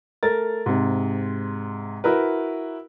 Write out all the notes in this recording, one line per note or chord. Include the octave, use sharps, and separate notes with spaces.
A3 A#4 A6
G#2 C3
E4 F#4 A#4 B4